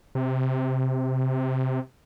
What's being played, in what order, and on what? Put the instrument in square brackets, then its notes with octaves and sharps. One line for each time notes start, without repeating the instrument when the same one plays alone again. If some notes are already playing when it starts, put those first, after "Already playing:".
[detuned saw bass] C3